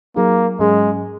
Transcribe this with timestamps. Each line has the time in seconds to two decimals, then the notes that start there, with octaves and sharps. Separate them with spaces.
0.16 F#3 A#3 D#4 G#4
0.59 G#2 F#3 G#3 C#4 G#4